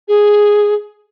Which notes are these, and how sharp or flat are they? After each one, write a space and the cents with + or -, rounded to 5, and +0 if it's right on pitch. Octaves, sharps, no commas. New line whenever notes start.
G#4 +0